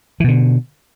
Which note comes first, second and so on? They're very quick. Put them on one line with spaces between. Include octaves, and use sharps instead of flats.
E3 B2 D3